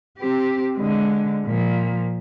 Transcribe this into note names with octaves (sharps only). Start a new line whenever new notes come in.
C4 G4
D3 G#3
A#2 F3